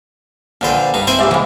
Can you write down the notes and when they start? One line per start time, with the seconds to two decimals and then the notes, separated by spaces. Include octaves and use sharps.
0.61 A#1 D3 D4 B4 C5 G5
0.94 G2 D#4
1.07 C4 E4 C5 G#5
1.19 A#1 G#2 G3 E5
1.31 E3 G#3